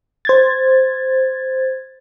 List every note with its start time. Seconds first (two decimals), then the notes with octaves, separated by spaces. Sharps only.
0.25 C5 G#6 A6